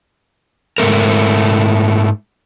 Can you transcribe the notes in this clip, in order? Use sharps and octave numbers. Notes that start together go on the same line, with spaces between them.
G#2 G#3 A3 A#4